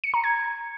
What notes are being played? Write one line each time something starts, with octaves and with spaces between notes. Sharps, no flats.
C#7
A#5
G#6